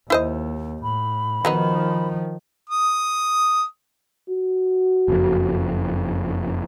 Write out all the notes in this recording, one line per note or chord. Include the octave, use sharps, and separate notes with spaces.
D#2 E4 C5 D#5
A2 B5
D#3 F3 F#3 B3 D#4
D#6
F#4
F#1 F2